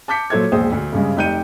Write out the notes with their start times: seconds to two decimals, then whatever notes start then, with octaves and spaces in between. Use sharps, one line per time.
0.08 A5 D6 G6 B6 C#7
0.30 A#2 F#3 A4 C5 C#5 G#6
0.52 E1 A#1 C5 D#6
0.72 D2
0.92 G2 C#3 G#3
1.16 F1 D#4 G4 G6 C#7 D#7